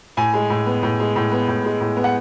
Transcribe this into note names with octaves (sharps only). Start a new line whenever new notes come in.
A2 G#5
G#3
A2
B3
A2
G#3
A2
B3
A2
G#3
A2
B3
F#5